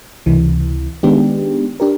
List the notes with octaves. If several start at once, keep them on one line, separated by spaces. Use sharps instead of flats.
C#2 C3 E3
D#3 G#3 B3 D4 G4
D4 G4 A#4